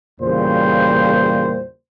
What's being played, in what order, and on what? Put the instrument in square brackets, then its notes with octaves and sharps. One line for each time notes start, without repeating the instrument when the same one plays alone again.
[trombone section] E2 A#2 C#3 G3 C5